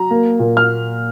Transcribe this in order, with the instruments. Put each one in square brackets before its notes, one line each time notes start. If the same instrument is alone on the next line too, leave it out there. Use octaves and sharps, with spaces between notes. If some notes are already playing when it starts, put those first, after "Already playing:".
Already playing: [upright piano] F#3 [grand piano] A#5
[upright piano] A#3
A#2
[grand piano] F6